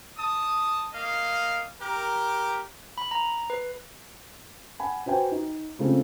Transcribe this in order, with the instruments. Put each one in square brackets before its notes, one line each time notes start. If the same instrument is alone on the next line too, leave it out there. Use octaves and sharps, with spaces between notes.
[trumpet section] A5 D#6
A#3 D#5 F5
G4 A#4
[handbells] B5
A#5
B4
[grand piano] F#5 G#5 B5
F#4 B4 C5 G5 G#5
D#4
C#3 G#3 A3 C4 F4